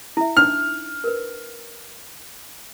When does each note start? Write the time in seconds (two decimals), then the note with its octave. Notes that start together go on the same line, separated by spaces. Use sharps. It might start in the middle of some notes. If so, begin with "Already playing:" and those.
0.17 E4 E5
0.37 D4 D#4 F6
1.04 A#4 B4